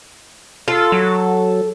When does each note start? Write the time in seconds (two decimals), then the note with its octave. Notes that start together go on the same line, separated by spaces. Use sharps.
0.68 F4 A4
0.92 F#3